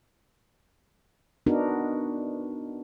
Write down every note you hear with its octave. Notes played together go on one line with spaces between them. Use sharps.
B3 D4 D#4 F#4 A#4